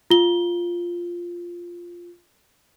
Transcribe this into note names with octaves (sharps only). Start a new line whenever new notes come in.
F4 G7